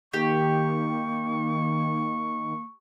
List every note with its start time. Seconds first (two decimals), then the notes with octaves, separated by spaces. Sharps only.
0.13 D#3 A#3 G4 C#6